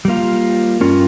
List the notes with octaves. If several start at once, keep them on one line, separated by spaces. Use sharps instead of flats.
G3 A#3 F4
G2 G3 C#4 F4 A#4